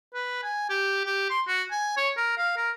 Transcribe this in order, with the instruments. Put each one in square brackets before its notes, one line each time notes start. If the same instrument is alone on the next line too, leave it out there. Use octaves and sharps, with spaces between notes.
[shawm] B4
G#5
G4
G4
C6
F#4
G#5
C#5
A#4
F5
A#4